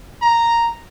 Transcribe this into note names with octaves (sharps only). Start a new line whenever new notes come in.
A#5